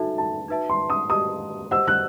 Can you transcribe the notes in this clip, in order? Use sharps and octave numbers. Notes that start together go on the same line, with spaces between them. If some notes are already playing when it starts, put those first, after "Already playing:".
Already playing: D#4 F#4 A4 E5 A5
A5
D#4 F#4 B4 E5 A5
C6
D#6
G4 D#5 A5 D#6
G4 C5 D#5 F#5 E6
F#6